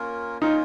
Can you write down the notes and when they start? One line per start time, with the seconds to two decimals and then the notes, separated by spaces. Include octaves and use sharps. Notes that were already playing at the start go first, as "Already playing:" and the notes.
Already playing: A#3 C#4 F4 A#4
0.41 A#3 C#4 D#4 F4 A#4